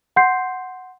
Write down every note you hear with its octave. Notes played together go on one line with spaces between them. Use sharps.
F#5 C6 G6 C7